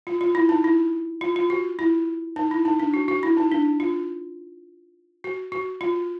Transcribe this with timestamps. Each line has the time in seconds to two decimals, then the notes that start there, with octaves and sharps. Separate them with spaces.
0.07 F4
0.21 F4
0.35 E4
0.49 D#4
0.64 E4
1.21 F4
1.36 F4
1.50 F#4
1.79 E4
2.36 D#4
2.51 E4
2.65 D#4
2.80 D4
2.94 F#4
3.08 F#4
3.23 E4
3.37 D#4
3.52 D4
3.80 F4
5.24 F#4
5.52 F#4
5.81 F4